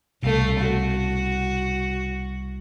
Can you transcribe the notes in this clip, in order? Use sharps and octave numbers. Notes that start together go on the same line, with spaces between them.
C2 B2 A3 F5
F#4